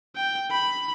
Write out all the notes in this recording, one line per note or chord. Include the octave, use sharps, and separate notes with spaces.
G5
B5